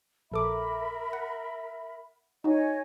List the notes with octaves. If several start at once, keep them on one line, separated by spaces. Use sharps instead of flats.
A#1 A4 A#4 E5 B5 D6
F#5
D#4 F#4 C#5 D#5 G#5